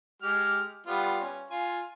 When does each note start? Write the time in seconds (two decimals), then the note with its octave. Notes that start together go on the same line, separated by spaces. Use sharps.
0.22 G#3 G4 F6
0.87 G3 B3 F4
1.21 C#4
1.51 F4 G#5